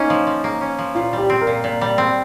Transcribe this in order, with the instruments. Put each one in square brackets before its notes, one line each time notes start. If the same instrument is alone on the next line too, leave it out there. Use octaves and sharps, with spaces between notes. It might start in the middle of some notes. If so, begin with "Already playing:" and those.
Already playing: [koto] A#3 C#4 [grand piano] D#4
[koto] F3
F3
A#3
C#4
F3
[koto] A#2 [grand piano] F4
[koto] G3 [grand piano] G4
[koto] C4
[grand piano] A#4
[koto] A#2
A#2
G3
C4